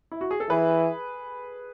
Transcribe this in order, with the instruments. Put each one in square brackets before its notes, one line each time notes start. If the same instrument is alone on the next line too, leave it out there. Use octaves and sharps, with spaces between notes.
[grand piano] E4
F#4
G#4
A4
[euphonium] E3 [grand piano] G#4 B4